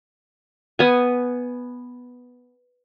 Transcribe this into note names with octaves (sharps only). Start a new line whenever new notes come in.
B3 G#5